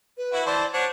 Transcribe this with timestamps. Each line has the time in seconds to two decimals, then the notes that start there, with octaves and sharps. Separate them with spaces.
0.17 B4
0.33 E4 F#4
0.46 E3 C5 D5 A5
0.74 D4 F#4 C5 C#5